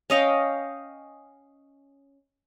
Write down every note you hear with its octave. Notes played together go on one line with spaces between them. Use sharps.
C#4 D#5 F5 G5